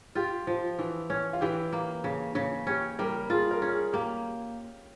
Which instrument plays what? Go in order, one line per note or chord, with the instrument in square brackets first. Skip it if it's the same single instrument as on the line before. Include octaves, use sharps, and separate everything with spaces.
[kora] F4 [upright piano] G4
[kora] F3
E3
C#4
[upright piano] F4
[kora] E3 [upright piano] G4
[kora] A#3
C#3
C#3
[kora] C#4 [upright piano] G4
[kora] G3 [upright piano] A#4
[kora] F4 [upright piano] G#4
[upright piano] A#4
[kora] C#4
[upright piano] G#4
[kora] A#3 [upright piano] G4